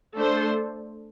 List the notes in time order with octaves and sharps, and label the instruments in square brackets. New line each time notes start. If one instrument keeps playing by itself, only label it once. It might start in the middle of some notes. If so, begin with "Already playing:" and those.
[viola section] A3 D4 A4 C5